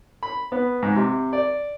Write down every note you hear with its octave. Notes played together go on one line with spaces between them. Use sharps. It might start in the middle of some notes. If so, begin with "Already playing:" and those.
B5
B3
G#2
C3
D5